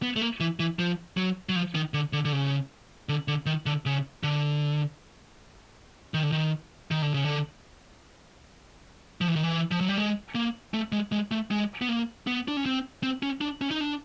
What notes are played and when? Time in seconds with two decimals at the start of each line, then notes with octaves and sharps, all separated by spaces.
0.03 B3
0.16 A3
0.21 A#3
0.40 E3
0.60 E3
0.79 F3
1.17 F#3
1.49 F#3
1.56 F3
1.75 D#3
1.94 D3
2.13 D3
2.25 D3
2.32 C#3
3.09 D3
3.28 D3
3.46 D#3
3.66 D3
3.86 C#3
4.23 D3
6.14 D#3
6.23 D3
6.32 D#3
6.91 D#3
7.02 D3
7.14 C#3
7.25 D3
9.21 F3
9.28 E3
9.36 D#3
9.43 E3
9.71 F3
9.81 F#3
9.88 G3
9.98 G#3
10.35 A#3
10.74 A3
10.92 G#3
11.12 G#3
11.31 A3
11.51 G#3
11.81 B3
11.89 A#3
12.27 B3
12.48 D4
12.57 C#4
12.66 C4
13.03 C4
13.23 C#4
13.41 D4
13.61 C#4
13.71 D#4
13.81 D4